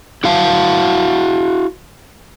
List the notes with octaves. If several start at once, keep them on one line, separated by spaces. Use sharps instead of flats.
E4 F#4 F5 A5